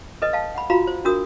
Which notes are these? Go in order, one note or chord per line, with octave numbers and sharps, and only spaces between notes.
A4 B4 D#5
F5 A5
F#5 B5
F4 F#4 F5 A#5 B5
C5
D4 F#4 A#4 D#6